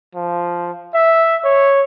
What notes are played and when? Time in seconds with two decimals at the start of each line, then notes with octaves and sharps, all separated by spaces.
0.15 F3
0.94 E5
1.45 C#5